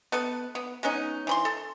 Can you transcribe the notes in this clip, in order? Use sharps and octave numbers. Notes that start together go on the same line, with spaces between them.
B3 A4 B4
B3
G#3 B3 C#4 D#4
E3 B5 C6
A4